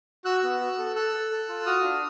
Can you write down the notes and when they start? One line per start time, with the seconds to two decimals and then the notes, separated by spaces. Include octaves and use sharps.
0.25 F#4 E6 F#6
0.43 B3
0.61 F#4
0.78 A4
0.95 A4 E6 F#6
1.13 A4
1.31 A4
1.49 F4
1.66 F#4 D#6 F6
1.84 D4